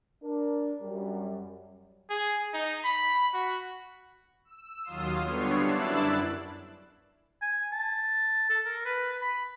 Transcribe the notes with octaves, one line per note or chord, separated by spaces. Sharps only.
D4 A#4
F#2 G3
G#4
D#4
B5
F#4
E6
D#2 F#3 F4 F5 C6 D#6
D3 G3 B3 C#5 C7
F#2 D4 E4 E6 F#6 A6
G#5
A5
A4
A#4
B4
B5